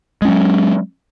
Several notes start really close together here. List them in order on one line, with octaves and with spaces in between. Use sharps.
G#3 C#4 F#3